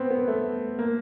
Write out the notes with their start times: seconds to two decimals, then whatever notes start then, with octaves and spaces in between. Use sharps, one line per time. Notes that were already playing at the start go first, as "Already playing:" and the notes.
Already playing: B3 C4
0.11 B3
0.28 A3
0.79 A#3